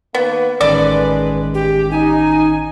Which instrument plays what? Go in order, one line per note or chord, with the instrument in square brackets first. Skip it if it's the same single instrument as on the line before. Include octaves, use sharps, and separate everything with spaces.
[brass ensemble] D#3 A#3 B4 [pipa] B3
[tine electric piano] A1 D#3 C#4 [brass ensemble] G#3 [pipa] A4 D5 [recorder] B4
[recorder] G4
[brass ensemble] D#4 [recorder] G#5